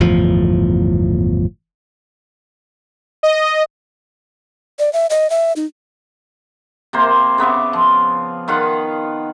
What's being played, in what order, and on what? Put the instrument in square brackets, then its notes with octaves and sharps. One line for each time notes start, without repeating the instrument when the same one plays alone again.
[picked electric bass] G1 E2 A2 F3
[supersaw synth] D#5
[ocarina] D5
E5
D#5
E5
D#4
[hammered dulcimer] C3 A#3 C5
C#3 B3 E5 D6
F3
D#3 F4 F5 F#5